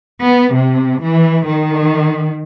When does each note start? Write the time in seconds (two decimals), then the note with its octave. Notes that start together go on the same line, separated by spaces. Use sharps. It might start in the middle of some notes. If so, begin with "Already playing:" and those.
0.23 B3
0.54 C3
1.05 E3
1.49 D#3